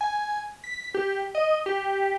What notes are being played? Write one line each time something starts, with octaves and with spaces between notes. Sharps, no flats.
G#5
B6
G4
D#5
G4